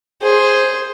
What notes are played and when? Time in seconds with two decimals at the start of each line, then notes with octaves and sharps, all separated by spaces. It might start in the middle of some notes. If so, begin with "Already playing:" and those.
0.22 G#4 C5